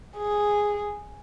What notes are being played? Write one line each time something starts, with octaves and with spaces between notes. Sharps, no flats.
G#4